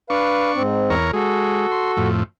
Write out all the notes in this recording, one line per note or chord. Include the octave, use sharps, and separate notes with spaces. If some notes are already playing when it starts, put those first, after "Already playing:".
D4 B4 F5 C#6
G#2 C4
E2 A#4 C#5
G#3 F#4 A4
C6
F2 A2